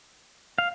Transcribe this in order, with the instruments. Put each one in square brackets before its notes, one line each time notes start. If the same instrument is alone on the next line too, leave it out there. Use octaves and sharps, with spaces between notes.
[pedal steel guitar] F5